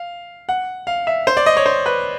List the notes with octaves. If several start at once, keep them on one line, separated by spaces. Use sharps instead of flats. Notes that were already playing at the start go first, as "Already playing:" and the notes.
Already playing: F5
F#5
F5
E5
C5
D5
D#5
C#5
C5
B4